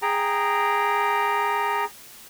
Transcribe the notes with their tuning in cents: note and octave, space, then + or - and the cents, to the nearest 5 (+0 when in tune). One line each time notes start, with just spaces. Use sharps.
G#4 -10 G5 +0 A#5 +0